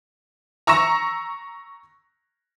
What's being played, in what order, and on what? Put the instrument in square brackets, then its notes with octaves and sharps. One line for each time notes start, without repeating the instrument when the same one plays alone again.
[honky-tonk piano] A#5 C#6 E6 A#6 E7